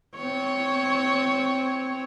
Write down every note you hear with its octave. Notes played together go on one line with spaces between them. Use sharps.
C4 C#5